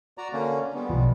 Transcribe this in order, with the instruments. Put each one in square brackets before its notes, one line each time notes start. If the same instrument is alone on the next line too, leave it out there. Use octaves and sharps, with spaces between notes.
[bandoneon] F#4 D5 A#5
D3 A#3 C#4
G3 G#3 B3
[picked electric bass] B1 F3